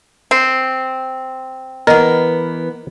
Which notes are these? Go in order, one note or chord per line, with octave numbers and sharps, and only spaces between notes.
C4
E3 B3 A#4 D#5 F#5